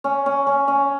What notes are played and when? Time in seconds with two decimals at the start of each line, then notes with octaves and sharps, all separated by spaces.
0.04 C#4
0.26 C#4
0.47 C#4
0.68 C#4